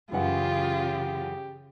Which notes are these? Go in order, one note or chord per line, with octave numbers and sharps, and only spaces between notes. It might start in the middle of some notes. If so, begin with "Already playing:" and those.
F#2 C#3 E3 F4 G4 F#5